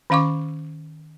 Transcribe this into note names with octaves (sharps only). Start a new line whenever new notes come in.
D#3 C#4 F5 C#6 D6